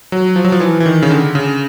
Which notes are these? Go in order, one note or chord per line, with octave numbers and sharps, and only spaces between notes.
F#3
F3
F#3
F3
E3
E3
D#3
C#3
D3
C#3